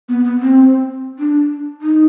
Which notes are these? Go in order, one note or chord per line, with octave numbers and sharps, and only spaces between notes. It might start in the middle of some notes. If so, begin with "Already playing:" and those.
B3
B3
C4
D4
D#4